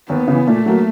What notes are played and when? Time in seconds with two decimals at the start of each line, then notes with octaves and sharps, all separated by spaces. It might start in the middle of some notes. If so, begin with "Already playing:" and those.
0.09 D#2 B3
0.28 C#3 E3
0.47 A#2 A3
0.66 F#3 A#3